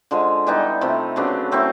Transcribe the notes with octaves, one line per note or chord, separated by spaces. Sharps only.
D3 F3 G#3
E3 G3 B3 D#4
C3 F3 A3
C#3 F#3 B3 D4
F#3 A3 C4 E4